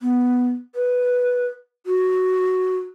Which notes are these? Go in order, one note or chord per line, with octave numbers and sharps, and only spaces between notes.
B3
B4
F#4